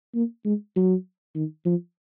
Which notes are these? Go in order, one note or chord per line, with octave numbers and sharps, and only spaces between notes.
A#3
G#3
F#3
D#3
F3